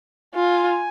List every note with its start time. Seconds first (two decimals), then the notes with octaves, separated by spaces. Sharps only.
0.34 F4 G#5